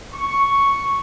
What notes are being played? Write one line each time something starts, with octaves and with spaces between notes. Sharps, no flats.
C#6